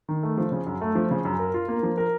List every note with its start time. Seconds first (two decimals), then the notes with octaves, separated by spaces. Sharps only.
0.09 D#3
0.23 A3
0.37 F3
0.52 C#3
0.67 F#2
0.81 A3
0.95 F3
1.11 C#3
1.25 F#2
1.39 A#4
1.54 F4
1.68 A#3
1.83 F3
1.98 A#4